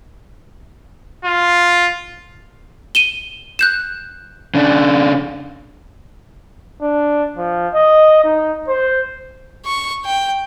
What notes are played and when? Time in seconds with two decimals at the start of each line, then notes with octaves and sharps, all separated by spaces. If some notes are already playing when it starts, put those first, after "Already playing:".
1.25 F4
2.95 D#7 E7 G7
3.59 F#6 G6 E7
4.54 C#3 D4
6.82 D4
7.37 F3
7.74 D#5
8.24 D#4
8.68 C5
9.66 C#6
10.05 G5